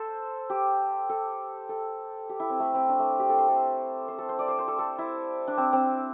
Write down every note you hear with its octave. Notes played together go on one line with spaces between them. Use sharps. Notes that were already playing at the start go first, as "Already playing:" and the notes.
Already playing: A4 C5
G4
A4
A4
G4
E4
C4
A3
C4
D4
A3
G4
A4
C5
A4
C5
A4
C5
D5
C5
C5
A4
A4
E4
D4
C4
C4